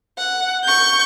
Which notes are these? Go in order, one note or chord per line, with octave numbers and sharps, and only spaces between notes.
F#5
C#6 G6